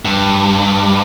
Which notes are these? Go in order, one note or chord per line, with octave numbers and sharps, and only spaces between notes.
G2